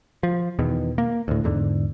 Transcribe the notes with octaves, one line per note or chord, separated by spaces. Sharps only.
F3
E2 B2 D#3
A#3
D2 A2
E2 G#2 D3